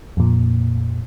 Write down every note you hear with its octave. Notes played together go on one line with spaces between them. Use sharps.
F2 A#2